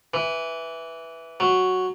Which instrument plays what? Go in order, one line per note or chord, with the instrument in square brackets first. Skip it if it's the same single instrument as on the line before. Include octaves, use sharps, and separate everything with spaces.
[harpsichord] E3
F#3